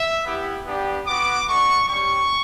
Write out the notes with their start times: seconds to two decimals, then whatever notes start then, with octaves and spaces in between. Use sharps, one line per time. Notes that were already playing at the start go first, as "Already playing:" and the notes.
Already playing: E5
0.26 B3 E4 G4
0.66 B3 D4 G4
1.07 B3 F#4 D6
1.48 A3 D4 F#4 C#6
1.88 G3 C#4 G4 C#6